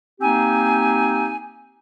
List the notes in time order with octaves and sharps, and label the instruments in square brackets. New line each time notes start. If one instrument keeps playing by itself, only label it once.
[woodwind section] A#3 C4 D#4 G4 G#5